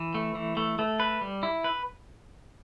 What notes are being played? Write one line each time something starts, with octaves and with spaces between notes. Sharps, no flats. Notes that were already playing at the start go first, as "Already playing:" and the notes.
Already playing: E3
A3
E3
A3
A3
B4
G3
E4
B4